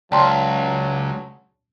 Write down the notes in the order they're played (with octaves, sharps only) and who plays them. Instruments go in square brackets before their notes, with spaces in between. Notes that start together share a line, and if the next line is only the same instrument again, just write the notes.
[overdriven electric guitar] C#2 [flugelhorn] F#3 [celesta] D5 A5 A#5 [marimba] G5 C6